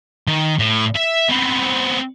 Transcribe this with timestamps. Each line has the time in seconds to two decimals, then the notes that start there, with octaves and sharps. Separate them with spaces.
0.28 D#3
0.59 A2
0.95 E5
1.29 B3 C4